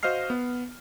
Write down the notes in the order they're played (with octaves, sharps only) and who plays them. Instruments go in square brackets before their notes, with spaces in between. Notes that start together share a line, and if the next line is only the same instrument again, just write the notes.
[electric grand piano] F#4 C5 D#5 F5 F6 C7
B3